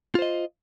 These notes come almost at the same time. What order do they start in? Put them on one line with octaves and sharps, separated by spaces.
F4 C5 D#5